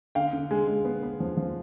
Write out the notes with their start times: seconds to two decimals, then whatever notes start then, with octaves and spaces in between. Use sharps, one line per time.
0.15 D3 F5 G5
0.33 D3
0.51 G#3
0.68 G#3
0.85 B3
1.03 B3
1.20 F3
1.37 F3